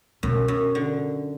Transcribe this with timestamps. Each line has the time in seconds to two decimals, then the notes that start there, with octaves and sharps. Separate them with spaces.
0.23 F#2 B2
0.48 F#2
0.75 D3